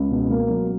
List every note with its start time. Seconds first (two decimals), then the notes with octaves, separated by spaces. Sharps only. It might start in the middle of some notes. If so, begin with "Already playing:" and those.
Already playing: C#2
0.11 B2
0.30 A#3
0.50 F#3